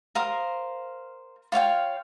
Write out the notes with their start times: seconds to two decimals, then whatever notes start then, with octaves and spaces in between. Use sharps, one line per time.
0.15 A#4 C5 F5 D#6
1.52 F4 C#5 F5 G5